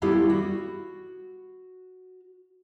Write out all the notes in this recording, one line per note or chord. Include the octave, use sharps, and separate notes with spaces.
G3 B3 E4 G4 A4 F5
F#4